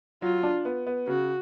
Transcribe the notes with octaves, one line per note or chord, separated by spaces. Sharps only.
F#3 F4
D4
B3
B3
C#3 F#4